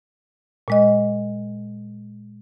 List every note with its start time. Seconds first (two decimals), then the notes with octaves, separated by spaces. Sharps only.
0.68 A#2 G#3 D#5